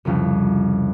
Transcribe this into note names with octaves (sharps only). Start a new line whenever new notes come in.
C2 F2 C#3 G3